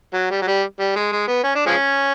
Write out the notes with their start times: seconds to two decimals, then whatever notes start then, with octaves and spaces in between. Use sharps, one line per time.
0.14 F#3
0.31 G3
0.42 F#3
0.47 G3
0.80 G3
0.96 G#3
1.12 G#3
1.28 B3
1.44 C#4
1.55 D4
1.67 F3 G#3 C#4